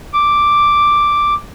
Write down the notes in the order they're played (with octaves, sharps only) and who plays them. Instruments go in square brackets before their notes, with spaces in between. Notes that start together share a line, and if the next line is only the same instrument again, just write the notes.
[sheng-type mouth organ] D6